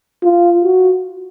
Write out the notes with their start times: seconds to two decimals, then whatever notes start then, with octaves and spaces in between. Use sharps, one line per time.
0.23 F4
0.64 F#4